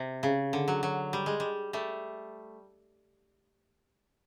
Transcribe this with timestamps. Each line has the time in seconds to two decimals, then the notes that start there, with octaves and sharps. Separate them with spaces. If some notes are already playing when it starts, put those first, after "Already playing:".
Already playing: C3
0.23 C#3
0.53 D3
0.68 F#3
0.83 F#3
1.13 G3
1.26 G#3
1.40 G3
1.73 G3 A3